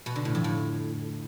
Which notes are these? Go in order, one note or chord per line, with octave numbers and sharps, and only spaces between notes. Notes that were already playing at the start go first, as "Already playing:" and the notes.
B2
D3
A2
F2
A2